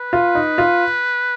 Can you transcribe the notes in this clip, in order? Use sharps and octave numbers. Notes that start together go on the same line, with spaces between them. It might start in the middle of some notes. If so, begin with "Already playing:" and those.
Already playing: B4
F4
D#4
F4